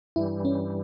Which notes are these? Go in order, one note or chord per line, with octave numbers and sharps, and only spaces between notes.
G2 E3 G3 E4
C#4